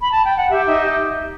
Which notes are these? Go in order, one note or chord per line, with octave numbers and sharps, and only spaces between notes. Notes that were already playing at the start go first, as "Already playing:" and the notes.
B5
A5
G5
F#5
G4 E5
D#4 E5
G4